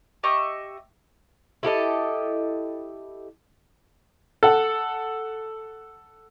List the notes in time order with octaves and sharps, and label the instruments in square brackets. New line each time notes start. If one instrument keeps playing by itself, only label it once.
[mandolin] G4 D#5 E5 C#6
[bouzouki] E4 G4 A4 D#5
[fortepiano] A4 F#5